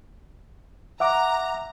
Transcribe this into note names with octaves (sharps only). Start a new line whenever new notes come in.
E5 F#5 A#5 D6